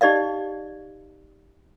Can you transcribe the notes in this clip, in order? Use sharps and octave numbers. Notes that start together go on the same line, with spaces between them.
D#4 G4 D5 D#5 F5